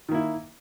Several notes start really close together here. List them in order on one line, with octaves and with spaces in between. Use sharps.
D#3 A#3 E4